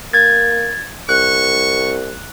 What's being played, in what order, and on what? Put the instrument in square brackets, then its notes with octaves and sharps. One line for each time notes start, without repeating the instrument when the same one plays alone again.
[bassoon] A#3 [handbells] G#6 A6
[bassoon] C2 [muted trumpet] C#6 [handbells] F#6